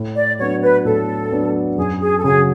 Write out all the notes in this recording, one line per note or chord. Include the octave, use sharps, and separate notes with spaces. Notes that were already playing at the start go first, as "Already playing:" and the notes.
Already playing: A2
D5
F#3 B3 D4 C#5
B4
A2 A4
F#3 B3 D4
F#2 G#4
G#4
A4
C#3 F#3 G#4